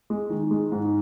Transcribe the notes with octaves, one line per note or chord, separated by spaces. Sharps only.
G#3
D#3
G#3
G#2